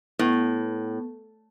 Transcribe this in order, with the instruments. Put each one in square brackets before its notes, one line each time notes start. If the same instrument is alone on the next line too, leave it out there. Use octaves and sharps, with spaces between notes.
[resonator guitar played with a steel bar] A2 [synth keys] B3